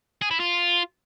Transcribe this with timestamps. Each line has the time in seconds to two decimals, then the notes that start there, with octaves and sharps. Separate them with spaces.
0.22 G#4
0.31 E4
0.40 F4